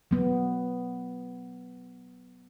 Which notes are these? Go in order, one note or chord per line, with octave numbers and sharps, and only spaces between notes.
F#3 B3